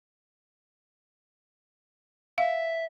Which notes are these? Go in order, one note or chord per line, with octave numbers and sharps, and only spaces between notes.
E5 F5